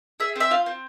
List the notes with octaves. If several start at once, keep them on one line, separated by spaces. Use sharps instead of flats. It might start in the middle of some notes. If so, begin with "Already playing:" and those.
G#4 E5
C4 E5
F4 F5
C4